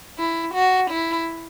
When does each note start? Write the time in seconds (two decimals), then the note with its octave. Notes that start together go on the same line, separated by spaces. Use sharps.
0.18 E4
0.54 F#4
0.90 E4